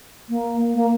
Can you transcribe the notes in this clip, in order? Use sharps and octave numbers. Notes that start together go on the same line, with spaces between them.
A#3
A#3